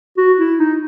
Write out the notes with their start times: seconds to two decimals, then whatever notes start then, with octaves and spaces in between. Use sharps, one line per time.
0.18 F#4
0.38 E4
0.59 D#4